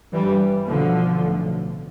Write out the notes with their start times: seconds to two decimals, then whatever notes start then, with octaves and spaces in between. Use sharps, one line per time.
0.13 G1 G2 E3 G3
0.66 B1 B2 D3 F3
1.20 B1 A2